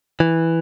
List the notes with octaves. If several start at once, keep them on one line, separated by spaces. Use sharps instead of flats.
E3